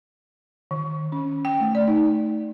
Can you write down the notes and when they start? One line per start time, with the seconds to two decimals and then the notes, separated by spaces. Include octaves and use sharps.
0.71 D#3
1.12 C#4
1.45 G5
1.60 A3
1.75 D5
1.88 D#4